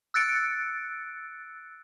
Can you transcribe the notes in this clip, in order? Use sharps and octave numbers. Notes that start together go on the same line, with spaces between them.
E6 F#6 A6 C#7 D7